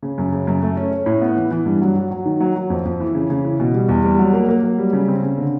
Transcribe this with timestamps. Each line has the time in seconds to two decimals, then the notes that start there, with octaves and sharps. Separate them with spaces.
0.03 C#3
0.18 F#2
0.32 C#3
0.47 F#2
0.62 A3
0.77 C#4
0.91 C#4
1.06 A2
1.21 B3
1.37 E3
1.51 E3
1.66 G2
1.81 F#3
1.96 F#3
2.11 F#3
2.25 D#3
2.40 F#3
2.56 F#3
2.70 F2
2.85 F2
3.00 E3
3.15 C#3
3.30 C#3
3.45 E3
3.60 B2
3.74 G3
3.89 E2
4.04 G3
4.19 F#3
4.33 A#3
4.49 A#3
4.63 F#3
4.78 G3
4.93 C#3
5.08 C4
5.23 C#3
5.38 D3